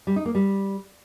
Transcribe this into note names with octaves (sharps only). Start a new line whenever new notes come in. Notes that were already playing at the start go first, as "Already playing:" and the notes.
G3
D#4
A#3
G3